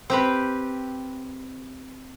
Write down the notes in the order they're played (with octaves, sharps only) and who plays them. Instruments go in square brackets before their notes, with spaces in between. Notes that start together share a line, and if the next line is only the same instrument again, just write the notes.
[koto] C4 G4 B4